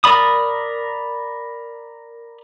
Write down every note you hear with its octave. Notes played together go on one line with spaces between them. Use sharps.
A#4 D5 B5 D#6